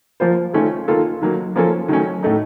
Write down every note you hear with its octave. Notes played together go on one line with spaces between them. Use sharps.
F3 A#3 F4 C5
D#3 A3 C#4 F4 A4
D#3 A#3 F4 A4
D#3 F#3 A#3
F3 A#3 C#4 F4 A4
D#3 F#3 A3 C#4
A2 A3 D#4